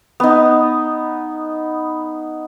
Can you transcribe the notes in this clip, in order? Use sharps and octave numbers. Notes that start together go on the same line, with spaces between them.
B3 D#4